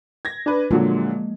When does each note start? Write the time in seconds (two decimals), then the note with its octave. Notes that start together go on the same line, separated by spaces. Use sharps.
0.25 G#6 A#6
0.46 D4 B4
0.71 A#2 D3 F3 F#3 G#3 A#3